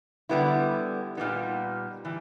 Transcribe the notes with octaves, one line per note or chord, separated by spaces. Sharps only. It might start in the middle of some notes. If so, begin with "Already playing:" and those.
D3 G3 B3 E4
A#2 G3 B3 D#4
E3 G3